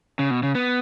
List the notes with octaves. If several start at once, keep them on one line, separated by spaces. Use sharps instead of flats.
C#3
B2
C#3
B3